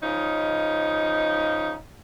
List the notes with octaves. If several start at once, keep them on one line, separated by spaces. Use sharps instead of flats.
C#3 F3 C#4 D#4